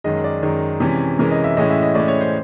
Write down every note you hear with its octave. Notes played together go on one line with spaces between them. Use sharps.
F#2 D#3 G#3 D#5
D5
F#2 D#3 G#3
C3 E3 G#3 C#4
C3 E3 G#3 C#4 A#4
D#5
E5
A2 E3 G#3 C#4 D#5
E5
D#5
A2 E3 G#3 C#4 D5
C#5
C5